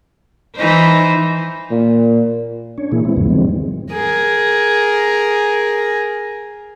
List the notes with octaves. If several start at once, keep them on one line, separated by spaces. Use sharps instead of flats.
E3 D#4 C5
A#2
C#4 D4 C#5
A#2 E3 A#3 E4 G#4
G#3 B3 C4 E4
E2 G#2 C#3 F3 B3
D3 D#3 F3 G3 G#3 C4
G#4 A#4